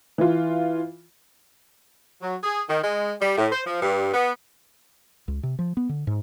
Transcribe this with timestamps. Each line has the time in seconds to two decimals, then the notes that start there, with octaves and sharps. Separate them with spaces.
0.18 E3 F4
2.22 F#3
2.44 G#4
2.69 D#3
2.84 G#3
3.21 G3
3.38 A2
3.52 C5
3.66 F3
3.82 G2
4.14 B3
5.28 C#2
5.43 C3
5.59 F3
5.77 B3
5.89 D3
6.07 G#2